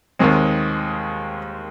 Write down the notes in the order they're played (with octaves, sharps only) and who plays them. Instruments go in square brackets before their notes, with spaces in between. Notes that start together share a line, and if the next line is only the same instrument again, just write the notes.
[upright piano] D#2 D#3 G#3 C4